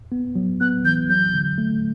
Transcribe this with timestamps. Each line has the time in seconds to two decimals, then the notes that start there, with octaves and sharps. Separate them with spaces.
0.12 B3
0.35 F#3
0.61 B3 F#6
0.85 E3 G6
1.09 F#3 G6
1.34 D3
1.58 A3